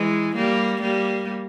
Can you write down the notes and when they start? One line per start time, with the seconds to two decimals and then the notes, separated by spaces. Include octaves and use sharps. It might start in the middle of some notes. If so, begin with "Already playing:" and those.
Already playing: E3 G#3
0.35 G3 A#3
0.81 G3 A#3